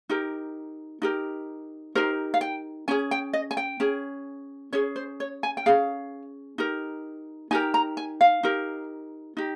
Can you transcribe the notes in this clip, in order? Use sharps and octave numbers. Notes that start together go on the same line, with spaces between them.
D#4 G4 A#4
D#4 G4 A#4
D#4 G4 A#4 C5
F5
G5
C#4 G#4 G#5
G5
D#5
G#5
G5
C#4 G#4
C#4 G#4 C#5
C5
C#5
G#5
G5
C#4 G#4 F5
D#4 G4 A#4
D#4 G4 A#4 G#5
A#5
G#5
F5
D#4 G4 A#4
D#4 G4